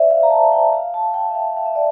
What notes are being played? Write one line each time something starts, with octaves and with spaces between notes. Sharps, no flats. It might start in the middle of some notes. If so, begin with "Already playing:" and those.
Already playing: C5 D5 E5
F5
A#5
A5
G5
F5
A5
G5
E5
F5
F5
E5
D5